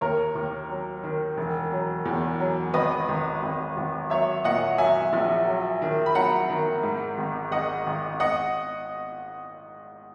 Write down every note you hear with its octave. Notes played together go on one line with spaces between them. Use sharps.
D#2 A#4 C#5
D#2
F#3
D#3
E1
F#3
E2
F#3
G#1 B4 D#5
G#1
G#1
G#1
F#3 C#5 E5
A#2 D#5 F#5
F#3 E5 G#5
A#1
F#3
D#3
B5
F#3 F#5 A#5
D#3
G#2
G#1
G#1 D#5 F#5
G#1
D#5 F#5